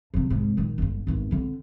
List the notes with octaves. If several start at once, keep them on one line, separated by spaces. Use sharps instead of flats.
F2 C3
C2 G#2
A#2 D#3
G1 G2
G#1 E2
D3 C4